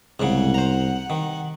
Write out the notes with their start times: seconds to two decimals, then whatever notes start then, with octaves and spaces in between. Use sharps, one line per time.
0.20 C2 G#2 C#3 F#5
0.54 C5 A#5
1.10 D#3